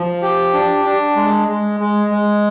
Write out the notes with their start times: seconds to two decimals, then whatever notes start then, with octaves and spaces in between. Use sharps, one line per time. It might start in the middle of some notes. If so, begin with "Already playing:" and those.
Already playing: F3
0.22 G4
0.53 D4
0.85 D4
1.16 G#3
1.48 G#3
1.80 G#3
2.10 G#3